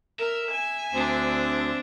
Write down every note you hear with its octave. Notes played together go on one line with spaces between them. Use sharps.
A#4 E5
G#5
D2 C4 D4